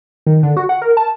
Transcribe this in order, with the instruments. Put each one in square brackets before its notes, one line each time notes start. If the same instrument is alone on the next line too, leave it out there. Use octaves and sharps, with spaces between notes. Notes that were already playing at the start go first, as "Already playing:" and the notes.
[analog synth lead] D#3
D3
F#4
F#5
A#4
A5